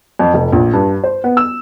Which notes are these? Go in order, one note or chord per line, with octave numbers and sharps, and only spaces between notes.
F2
F1
A#1
G2
C5
B3
E6